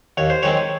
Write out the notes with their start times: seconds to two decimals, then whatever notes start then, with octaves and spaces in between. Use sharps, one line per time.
0.17 D#2 C#5
0.30 C5
0.43 D#3 G#3 C4 C#5